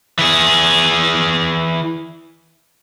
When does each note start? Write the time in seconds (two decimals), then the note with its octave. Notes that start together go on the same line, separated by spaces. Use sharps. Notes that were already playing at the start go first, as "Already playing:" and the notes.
0.19 E3 G#4